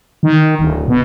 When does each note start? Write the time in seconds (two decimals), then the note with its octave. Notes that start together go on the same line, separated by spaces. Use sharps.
0.23 D#3
0.59 D1
0.88 B2